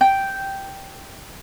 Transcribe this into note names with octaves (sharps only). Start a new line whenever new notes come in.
G5